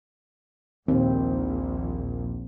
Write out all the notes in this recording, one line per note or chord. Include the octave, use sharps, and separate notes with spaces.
A#1 D#2 C4